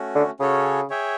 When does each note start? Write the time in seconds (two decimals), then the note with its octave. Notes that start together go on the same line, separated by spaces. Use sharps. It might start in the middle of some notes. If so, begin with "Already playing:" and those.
Already playing: A3 C#4 F#4
0.15 D3
0.40 C#3 C#4 F#4 A4 C#5
0.90 G#4 C#5 E5 G5